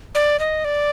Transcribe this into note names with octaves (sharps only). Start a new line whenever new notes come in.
D5
D#5
D5